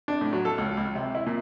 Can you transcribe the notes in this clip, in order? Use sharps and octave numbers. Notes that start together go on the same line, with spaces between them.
D4
A2
F#3
A4
C#2
C#2
C3
E4
A#2